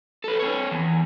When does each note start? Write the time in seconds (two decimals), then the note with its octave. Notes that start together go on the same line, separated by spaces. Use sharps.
0.24 A4 B4
0.40 C4 C#5
0.72 E2